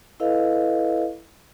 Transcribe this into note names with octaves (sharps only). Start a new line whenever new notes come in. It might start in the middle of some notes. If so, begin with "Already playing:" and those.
E4 A4 B4 D#5 F5